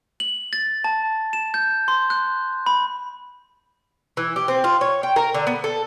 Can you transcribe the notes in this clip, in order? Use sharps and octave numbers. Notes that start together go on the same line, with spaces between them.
F#7
A6
A5
E7
G6
C6
F#6
B5
E3
G4
C4
F4
C#5
G5
A#4
D3
B3
A4